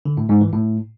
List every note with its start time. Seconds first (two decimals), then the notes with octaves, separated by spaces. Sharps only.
0.05 D3
0.17 A2
0.29 G#2
0.41 E3
0.53 A2